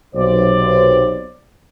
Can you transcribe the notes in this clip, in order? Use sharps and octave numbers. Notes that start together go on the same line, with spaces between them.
B1 C3 C5 D5